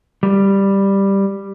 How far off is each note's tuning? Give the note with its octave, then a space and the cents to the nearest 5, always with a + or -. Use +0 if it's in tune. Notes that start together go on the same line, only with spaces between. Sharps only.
G3 +5